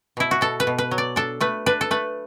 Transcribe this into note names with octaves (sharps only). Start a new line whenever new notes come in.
B2 E4
F#4
B2 A4
B4
B2
B4
F#3
D5
D4 A4
A3 B4
D4 B4
A4
A3 B4